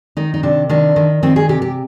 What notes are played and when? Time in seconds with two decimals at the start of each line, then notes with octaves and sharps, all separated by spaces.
0.17 D#3 D#4
0.34 D#4
0.43 C3 D4
0.69 D#3 D4
0.96 D#3
1.23 D#3 C4
1.36 G#4
1.49 C3 G4
1.62 G4